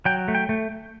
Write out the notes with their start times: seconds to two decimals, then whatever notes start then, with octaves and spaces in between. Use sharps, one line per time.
0.05 F#3 G5
0.28 A3
0.35 G5
0.49 A3